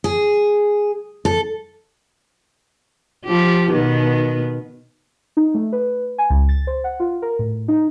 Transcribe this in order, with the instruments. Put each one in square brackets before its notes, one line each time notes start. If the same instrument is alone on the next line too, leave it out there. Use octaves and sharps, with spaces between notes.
[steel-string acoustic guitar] G#4
A4
[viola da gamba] F3 G4
B2 D#3 B3
[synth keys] D#4
A3
B4
G#5
C#2
A6
C5
F#5
F4
A#4
A2
D#4